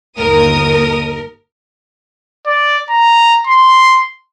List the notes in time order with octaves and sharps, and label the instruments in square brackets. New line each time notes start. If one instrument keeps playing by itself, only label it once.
[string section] G1 D#2 D#6 [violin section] A#4
[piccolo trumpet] D5
A#5
C6